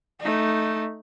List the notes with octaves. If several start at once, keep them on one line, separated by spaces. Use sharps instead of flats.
A3 D#4